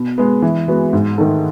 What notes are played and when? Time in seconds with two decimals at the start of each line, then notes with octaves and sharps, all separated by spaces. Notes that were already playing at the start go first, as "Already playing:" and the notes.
Already playing: B2
0.18 G#3 B3
0.42 E3
0.68 G#3 B3 F#4
0.93 G#2
1.18 D#3 A3 D#4 A4